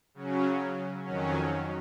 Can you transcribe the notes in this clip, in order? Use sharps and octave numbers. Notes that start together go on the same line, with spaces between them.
C#3 F#3 C#4
F2 D#3 F#3 C#4